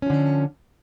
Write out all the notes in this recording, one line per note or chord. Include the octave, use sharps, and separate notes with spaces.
D3 F3 C#4